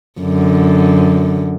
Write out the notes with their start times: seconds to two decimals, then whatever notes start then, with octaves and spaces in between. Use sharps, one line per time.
0.21 F#2 D3